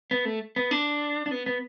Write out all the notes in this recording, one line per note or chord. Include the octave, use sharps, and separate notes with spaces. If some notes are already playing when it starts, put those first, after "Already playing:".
B3
A3
B3
D4
D4
B3
B3